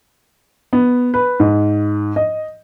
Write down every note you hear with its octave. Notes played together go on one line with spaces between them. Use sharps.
B3
B4
G#2
D#5